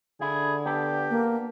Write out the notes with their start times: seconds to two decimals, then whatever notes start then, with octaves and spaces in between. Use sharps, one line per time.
0.21 D3 E4 G#4
0.66 B3 D4 G4 A4
1.10 A#3